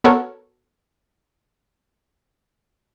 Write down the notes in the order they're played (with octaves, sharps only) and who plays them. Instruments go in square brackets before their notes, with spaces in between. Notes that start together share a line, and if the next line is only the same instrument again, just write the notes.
[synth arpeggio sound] B3 F#4 A4 A#4 C#5